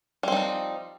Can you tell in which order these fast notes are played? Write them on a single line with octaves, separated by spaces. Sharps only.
G3 C4 D#4 F3